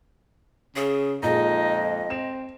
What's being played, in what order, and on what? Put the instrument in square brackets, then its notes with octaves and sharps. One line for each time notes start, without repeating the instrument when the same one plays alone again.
[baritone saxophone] C#3 [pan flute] G#4
[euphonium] F2 [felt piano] A#2 G#3 [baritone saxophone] D#4 [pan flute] D#5
[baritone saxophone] C4 [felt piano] E7